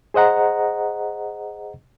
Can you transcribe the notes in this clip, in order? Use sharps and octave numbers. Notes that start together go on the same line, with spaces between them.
G#4 C5 D#5 F#5 A#5